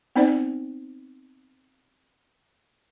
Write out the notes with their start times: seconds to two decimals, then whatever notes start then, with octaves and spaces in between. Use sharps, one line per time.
0.16 B3 C4 D#4 C5 D5